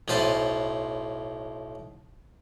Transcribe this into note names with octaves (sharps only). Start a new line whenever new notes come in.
B1 A2 B4 C5 A5